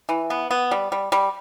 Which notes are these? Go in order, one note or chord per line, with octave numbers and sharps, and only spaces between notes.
E3
B3
B3
G3
G3
G3